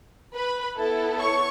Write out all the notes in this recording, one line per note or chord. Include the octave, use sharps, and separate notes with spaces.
B4 B5
B3 E4 A4
C#5 C#6